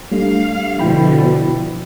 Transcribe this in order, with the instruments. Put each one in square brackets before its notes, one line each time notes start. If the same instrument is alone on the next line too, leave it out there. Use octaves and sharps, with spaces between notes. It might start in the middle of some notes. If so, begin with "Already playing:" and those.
[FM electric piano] G3 A3 D4 [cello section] F5
[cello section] B2 D3 F3 [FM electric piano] E4 G5 B5